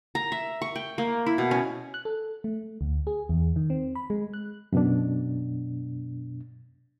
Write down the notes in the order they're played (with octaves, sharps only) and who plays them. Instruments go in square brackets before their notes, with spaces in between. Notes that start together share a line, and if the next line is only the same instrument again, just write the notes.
[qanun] A#5
E5
C#6
G5
A#3
E4
B2
C#4
[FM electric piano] F#6
A4
A3
D2
G#4
E2
D#3
C4
B5
G#3
F#6
[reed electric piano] F#2 B2 D4